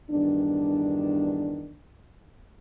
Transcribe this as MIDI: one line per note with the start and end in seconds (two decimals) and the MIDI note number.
0.11 1.75 40
0.11 1.75 43
0.11 1.75 51
0.11 1.75 62